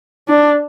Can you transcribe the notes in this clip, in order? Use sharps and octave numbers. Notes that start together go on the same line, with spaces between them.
D4